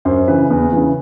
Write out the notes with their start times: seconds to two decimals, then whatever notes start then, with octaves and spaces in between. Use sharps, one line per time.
0.05 F#2 C5
0.28 C#3 E3 B4
0.50 E2
0.72 C#3 E3